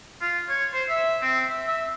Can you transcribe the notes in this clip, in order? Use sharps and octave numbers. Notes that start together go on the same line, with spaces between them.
F4
C#5
C5
E5
C4
E5
E5